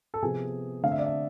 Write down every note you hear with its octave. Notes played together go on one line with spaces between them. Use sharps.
A4
C3 F3 B3 G#4
D3 A3 C4 F5
E5
D5
E5